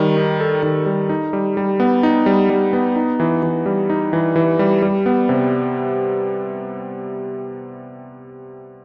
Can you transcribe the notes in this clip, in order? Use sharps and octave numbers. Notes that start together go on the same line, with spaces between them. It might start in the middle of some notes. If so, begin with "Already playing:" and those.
Already playing: D#3 G3
D#4
A4
D#3
G3
D#4
G3
G3
B3
D#4
G3
G3
B3
D#4
E3
E3
G3
D#4
E3
E3
G3
G3
B3
C3